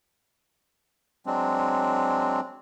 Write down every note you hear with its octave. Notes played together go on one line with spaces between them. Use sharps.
F#3 G#3 C4 D4